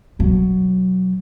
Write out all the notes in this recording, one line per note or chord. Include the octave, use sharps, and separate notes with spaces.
B2 F#3